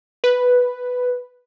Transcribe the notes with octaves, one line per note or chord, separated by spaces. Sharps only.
B4